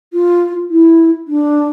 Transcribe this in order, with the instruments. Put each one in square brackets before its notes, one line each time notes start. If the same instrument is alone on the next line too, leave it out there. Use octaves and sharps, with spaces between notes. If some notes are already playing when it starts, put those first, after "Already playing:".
[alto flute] F4
E4
D4